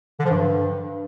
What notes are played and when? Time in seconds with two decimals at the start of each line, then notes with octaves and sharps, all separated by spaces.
0.20 D3
0.25 F3
0.30 G2